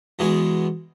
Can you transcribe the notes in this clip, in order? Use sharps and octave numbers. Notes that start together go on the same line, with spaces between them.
E2 B2 G#3 G#4